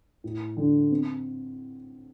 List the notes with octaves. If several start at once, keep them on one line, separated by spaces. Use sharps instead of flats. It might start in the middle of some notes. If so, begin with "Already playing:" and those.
A2
D3
C4